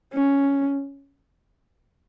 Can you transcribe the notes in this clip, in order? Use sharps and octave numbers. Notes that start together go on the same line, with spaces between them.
C#4